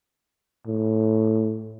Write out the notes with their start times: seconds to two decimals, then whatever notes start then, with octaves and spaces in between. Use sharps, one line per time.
0.67 A2